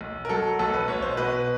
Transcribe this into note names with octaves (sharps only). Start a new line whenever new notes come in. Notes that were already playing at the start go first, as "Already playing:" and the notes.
B1
A#4
F#3 A4
B1 A4
B4
B1 C#5
C5
B2 B4